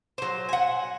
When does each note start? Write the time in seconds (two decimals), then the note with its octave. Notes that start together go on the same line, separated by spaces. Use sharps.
0.18 F#3 C5
0.49 F#5 G#5